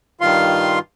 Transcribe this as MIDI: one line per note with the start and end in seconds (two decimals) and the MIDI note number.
0.21 0.79 43
0.21 0.79 51
0.21 0.79 65
0.21 0.79 77
0.21 0.79 84